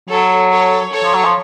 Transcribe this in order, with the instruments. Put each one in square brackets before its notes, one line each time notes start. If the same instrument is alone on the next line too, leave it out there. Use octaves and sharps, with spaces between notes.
[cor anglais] F#3 [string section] A4 C#5
[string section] A4 C#5
A4 C#5
[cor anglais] F3
F#3
F3